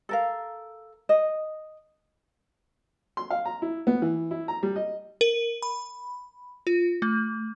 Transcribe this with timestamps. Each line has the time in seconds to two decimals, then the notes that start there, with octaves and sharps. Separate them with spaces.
0.09 A4 A#4 F5
1.09 D#5
3.17 C6
3.30 F5
3.45 A#5
3.62 E4
3.87 B3
4.02 E3
4.31 E4
4.48 A#5
4.63 G3
4.76 D#5
5.21 A#4
5.62 B5
6.67 F4
7.02 A3